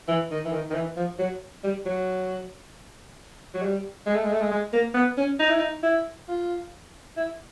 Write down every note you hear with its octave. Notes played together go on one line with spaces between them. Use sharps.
E3
D#3
E3
D#3
D#3
E3
F3
F#3
G3
F#3
F#3
G3
G#3
A3
G#3
A3
G#3
G#3
A#3
B3
C#4
D#4
E4
D#4
E4
F4
E4